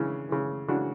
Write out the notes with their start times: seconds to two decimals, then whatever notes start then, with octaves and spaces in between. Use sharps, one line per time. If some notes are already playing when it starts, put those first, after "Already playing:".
Already playing: C#3 E3 C#4 D4
0.29 C#3 E3
0.68 C#3 E3 D4 F#4